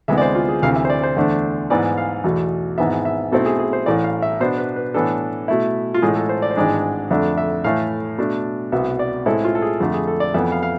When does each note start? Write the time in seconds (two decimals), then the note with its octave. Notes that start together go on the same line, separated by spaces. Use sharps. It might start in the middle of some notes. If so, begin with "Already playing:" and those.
0.08 D2 C3 E3 G#3 B3 E5
0.18 D5
0.22 C5
0.35 F4
0.49 G#4
0.62 D2 C3 E3 F5
0.76 E5
0.85 C5
0.90 D5
1.03 C5
1.16 E2 D3 A3 D4
1.70 G#2 E3 B3 D5
1.97 F5
2.24 E2 B2 A3
2.78 G#1 G#2 E3 B3 E5
3.05 E5
3.32 B1 B2 A3 C4 E4 A4
3.46 G#4
3.59 G#4
3.73 C5
3.86 A1 A2 E3 D5
4.04 F5
4.22 E5
4.40 B2 B3 D4 C5
4.58 B4
4.76 B4
4.94 A2 E3 B3 D4 A4
5.48 B2 A3 E4
5.94 F4
6.02 A1 A2 G#3 G#4
6.16 A4
6.29 C5
6.42 D5
6.51 C5
6.56 G#1 G#2 E3 G#3 D4 D5
7.10 F2 D3 A3 D4 E5
7.37 E5
7.64 A2 E3 A3 E4 F5
8.18 B2 A3 D4
8.72 C2 B2 B3 E5
8.99 D5
9.26 A2 G#3 C4 E4 A4
9.45 F4
9.55 A4
9.62 G#4
9.80 F2 D3 A3 F4
9.94 G#4
10.07 A4
10.20 D5
10.34 F2 E3 B3 E4 E5
10.52 F5
10.63 F5